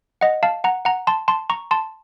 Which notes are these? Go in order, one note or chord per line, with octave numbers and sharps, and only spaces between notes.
D#5 F#5
F5 A5
F#5 A#5
F#5 A#5
A5 C6
A5 C6
A#5 C#6
A5 C6